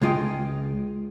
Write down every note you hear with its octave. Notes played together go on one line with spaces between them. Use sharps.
C#2 G#3 F4 D#5 G5